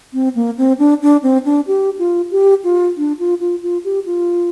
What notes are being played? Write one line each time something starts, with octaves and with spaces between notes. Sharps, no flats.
C4
A#3
C4
D4
D4
C4
D4
G4
F4
G4
F4
D4
F4
F4
F4
G4
F4